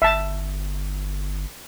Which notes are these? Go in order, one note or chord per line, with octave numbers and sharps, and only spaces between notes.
G1 E5 A5